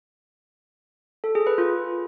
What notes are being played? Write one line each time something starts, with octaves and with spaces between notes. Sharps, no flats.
A4
G#4
B4
F4